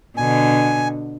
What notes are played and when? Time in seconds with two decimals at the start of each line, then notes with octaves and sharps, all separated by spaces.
0.17 B2 D3 G#5